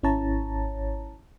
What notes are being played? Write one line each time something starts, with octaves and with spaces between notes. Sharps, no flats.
G#1 C#4 E4 C#5 A5 A#5